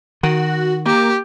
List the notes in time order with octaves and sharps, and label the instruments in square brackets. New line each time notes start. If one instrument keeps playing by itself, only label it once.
[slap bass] D#3 [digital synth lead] F#4
[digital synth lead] A#3 [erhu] G4